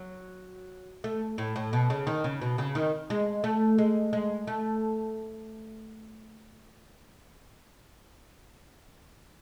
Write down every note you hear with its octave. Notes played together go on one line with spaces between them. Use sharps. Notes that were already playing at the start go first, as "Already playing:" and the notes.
Already playing: F#3
A3
A2
A2
B2
C#3
D#3
C#3
B2
C#3
D#3
G#3
A3
G#3
G#3
A3